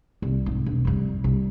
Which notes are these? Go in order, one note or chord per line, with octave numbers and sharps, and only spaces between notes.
C2
G#2
E1
C2 F2
C2